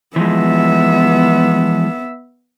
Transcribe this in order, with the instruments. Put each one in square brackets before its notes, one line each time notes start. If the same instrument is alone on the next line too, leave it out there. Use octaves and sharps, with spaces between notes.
[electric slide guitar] E3 F3 G#3 [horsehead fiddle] B3 E5